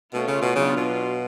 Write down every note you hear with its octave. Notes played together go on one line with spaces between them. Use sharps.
B2 A3 C#4 F4
C#3
B2
C#3 F#3 B3 D4 F4
B2